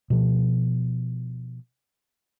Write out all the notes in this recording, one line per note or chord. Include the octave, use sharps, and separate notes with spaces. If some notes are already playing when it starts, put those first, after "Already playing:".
B2 F3